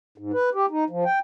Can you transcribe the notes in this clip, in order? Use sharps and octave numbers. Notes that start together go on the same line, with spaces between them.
G#2
B4
G4
D#4
F3
G5